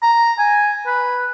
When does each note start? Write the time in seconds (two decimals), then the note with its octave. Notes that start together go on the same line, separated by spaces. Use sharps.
0.02 A#5
0.39 G#5
0.86 B4